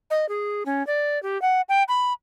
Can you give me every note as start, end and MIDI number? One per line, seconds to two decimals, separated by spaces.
0.11 0.29 75
0.29 0.64 68
0.66 0.85 61
0.87 1.21 74
1.23 1.40 67
1.42 1.61 78
1.69 1.83 79
1.88 2.13 83